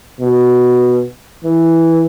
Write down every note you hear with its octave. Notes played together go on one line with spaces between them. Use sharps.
B2
E3